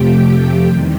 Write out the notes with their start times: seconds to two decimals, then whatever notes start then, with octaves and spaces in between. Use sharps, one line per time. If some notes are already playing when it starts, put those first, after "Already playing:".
Already playing: F2 C3 F3 A3 G4 G5
0.11 G4 G5
0.64 E2 C3 D#3 G3